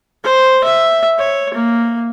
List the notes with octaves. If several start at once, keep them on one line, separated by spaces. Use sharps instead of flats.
C5
E5
C#5
A#3